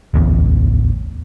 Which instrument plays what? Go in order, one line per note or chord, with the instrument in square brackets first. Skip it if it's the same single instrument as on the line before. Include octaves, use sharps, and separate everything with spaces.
[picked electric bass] D1 A1 E2